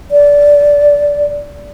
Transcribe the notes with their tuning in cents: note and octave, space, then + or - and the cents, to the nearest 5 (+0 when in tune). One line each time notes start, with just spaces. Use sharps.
D5 -15